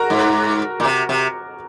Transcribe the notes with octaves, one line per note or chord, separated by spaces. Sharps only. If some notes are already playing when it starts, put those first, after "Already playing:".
Already playing: F#4 A#4 A#5
G#2
A#2
C3
C3